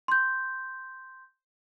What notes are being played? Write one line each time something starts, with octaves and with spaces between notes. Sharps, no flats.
C6 G6